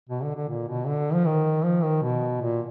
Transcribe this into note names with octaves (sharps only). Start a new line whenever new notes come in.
B2
D3
D3
A#2
B2
D3
F3
D#3
F3
D#3
B2
A#2